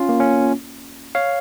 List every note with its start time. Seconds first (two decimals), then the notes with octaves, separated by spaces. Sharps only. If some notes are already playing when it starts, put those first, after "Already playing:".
Already playing: C#4 F4
0.09 A#3
0.20 C#4
1.15 C#5 F5